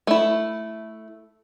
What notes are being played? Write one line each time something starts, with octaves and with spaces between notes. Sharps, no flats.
A3 E4